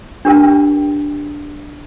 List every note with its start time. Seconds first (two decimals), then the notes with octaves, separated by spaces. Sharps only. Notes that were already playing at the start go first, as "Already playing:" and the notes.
0.25 D4 G4 A#4 G5